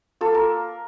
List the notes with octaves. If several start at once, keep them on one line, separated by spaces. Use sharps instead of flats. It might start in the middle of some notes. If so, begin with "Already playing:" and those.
A#3 F4 A4
A#4